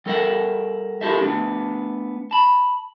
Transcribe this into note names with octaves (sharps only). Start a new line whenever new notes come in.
G3 A4 A#4 E5 F#5
E4 F4 G4 A4 A#4 E5
A3 B3 D4
A5 B5